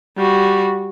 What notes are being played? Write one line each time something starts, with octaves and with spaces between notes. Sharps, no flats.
G3 F#4